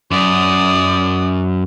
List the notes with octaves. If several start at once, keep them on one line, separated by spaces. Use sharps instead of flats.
F#2 D5 D#6